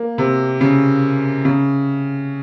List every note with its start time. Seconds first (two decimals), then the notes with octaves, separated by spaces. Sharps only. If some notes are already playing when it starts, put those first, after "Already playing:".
Already playing: A#3
0.18 C3
0.61 C#3
1.45 C#3